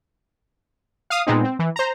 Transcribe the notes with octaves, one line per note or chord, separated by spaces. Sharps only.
F5 D#6
A#2 G#3 B3 C4 D#4
C4
E3
C5 A#5